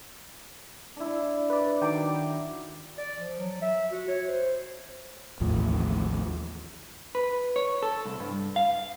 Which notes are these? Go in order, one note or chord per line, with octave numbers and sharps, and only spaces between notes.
D4 E4
B4 D5
D#3 F#3 D5 G5 A#5 D6
D5
F3
F#3
E5
F#4
C#5
C5
A1 D#2 A2 F3
B4
C#5
A4
C2
G2
F5